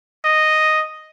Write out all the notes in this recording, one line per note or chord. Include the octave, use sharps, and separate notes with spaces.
D#5